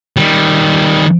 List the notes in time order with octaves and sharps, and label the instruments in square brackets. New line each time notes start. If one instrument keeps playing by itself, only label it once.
[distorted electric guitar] D#3 G3